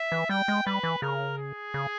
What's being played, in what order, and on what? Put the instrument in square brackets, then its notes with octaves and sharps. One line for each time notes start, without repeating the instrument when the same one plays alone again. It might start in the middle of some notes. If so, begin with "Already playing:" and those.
Already playing: [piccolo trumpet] E5
[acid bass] E3
[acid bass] G3 [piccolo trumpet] G5
[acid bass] G#3
[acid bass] G3 [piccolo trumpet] B4
[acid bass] E3
[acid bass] C#3 [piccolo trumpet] A#4
[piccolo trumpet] G#4
[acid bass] C#3